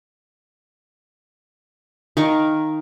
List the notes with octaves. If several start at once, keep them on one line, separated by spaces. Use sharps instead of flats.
D#3 A#4 F5 C#6